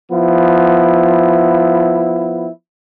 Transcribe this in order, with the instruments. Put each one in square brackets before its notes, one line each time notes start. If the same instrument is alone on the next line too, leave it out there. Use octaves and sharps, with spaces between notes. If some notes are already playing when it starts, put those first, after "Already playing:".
[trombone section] F3 B3 E4